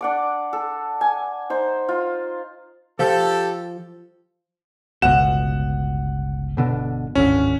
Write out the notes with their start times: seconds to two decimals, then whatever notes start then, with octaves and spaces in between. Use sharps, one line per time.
0.01 D4 F#5 D6
0.53 A4
1.01 G#5
1.50 D#4 C5
1.88 F4
2.99 F3 G4 A4
5.02 G1 C#2 B2 F#5 E7
6.57 G1 B2 D3
7.15 D1 G#1 D3 C#4